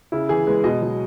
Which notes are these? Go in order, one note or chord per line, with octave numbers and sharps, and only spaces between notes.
C#3 E4
E3 G#4
G#3 B4
B2 D#5
F#3